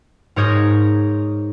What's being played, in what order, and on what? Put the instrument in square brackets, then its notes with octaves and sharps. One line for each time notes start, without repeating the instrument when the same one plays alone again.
[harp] G#2 A#4 C#5 D#6 G6 A#6